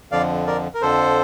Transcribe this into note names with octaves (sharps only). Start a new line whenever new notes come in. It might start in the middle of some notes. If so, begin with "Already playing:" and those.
F2 D3 F3 D5 F5
A#4 D5
A#4
F2 D3 F3 A4 C5